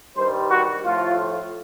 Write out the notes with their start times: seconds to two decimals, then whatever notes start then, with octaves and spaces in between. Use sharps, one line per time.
0.16 G2 D#3 G3 C5
0.51 F#4
0.84 A2 F3 A3 F4